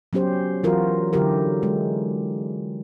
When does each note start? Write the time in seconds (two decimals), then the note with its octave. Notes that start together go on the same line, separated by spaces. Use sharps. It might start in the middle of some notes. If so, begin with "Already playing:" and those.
0.13 F#3 B3 C#4 G4 C5
0.63 E3 F#3 F4 F#4 A#4
1.13 D3 F#3 E4 G4 A#4
1.63 G#3